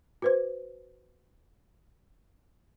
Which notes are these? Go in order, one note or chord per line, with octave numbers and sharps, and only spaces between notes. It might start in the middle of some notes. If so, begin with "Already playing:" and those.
F#4 B4 C5